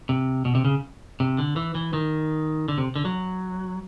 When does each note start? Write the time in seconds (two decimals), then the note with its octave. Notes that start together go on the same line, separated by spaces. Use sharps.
0.09 C3
0.45 B2
0.55 C3
0.65 C#3
1.20 C3
1.38 D3
1.56 E3
1.75 E3
1.93 D#3
2.68 D3
2.78 C3
2.96 D3
3.05 F#3